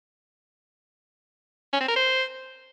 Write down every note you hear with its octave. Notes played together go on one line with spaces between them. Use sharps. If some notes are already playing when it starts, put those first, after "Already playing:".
C#4
C4
A#4
C5